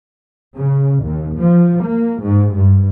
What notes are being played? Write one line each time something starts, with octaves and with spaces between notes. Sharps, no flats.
C#3
D#2
F3
A#3
G#2
G2